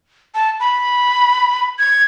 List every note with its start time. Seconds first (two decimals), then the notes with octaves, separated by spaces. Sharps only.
0.35 A5
0.60 B5
1.79 G#6